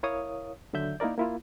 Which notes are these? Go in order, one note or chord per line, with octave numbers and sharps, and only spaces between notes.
E4 A#4 C#5 F5 D#6
D#2 D3 F#3 E5 G6
A#3 D#4 E4 A#4 D5
A#3 E4 F4